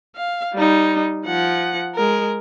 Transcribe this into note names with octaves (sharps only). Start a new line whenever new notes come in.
F5
G3 D#4
F3 F#5
G#3 A#4